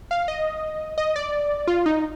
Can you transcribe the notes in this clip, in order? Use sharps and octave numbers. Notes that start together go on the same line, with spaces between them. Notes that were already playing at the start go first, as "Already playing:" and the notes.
F5
D#5
D#5
D5
F4
D#4